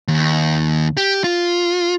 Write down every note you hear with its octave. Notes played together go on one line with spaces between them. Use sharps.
D#2
G4
F4